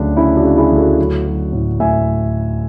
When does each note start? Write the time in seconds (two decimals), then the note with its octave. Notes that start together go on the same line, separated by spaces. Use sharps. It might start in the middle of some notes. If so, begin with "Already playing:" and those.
Already playing: D2 C#3 F#3 D4
0.16 C#3 C#4 E4
0.37 D4 F#4
0.44 C#3
0.57 E4 G#4
0.71 D2
0.78 F#4 A4
0.98 F#3
1.25 F#3
1.53 A2
1.80 A2 E5 G#5